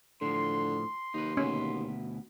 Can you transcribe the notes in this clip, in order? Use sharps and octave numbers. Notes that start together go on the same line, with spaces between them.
A2 D3 F3 C6
D#2 D#4 B4
D2 B2 C#4 B4